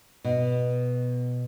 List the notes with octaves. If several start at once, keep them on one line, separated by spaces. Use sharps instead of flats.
B2